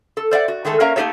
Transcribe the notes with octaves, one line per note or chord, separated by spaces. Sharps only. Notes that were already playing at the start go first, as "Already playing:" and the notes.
A4
C5 D5 E5 F#5
F#4
D#3 G#3 A3 A4
A#3 C#4 A#4 E5 F5 A#5
A3 A#3 D#4 G4 A4 C#5